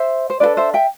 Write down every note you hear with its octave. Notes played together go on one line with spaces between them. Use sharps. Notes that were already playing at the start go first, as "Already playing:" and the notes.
Already playing: C5 E5
C5
D4 F4 A4 B4 D5
C5 E5
E5 G5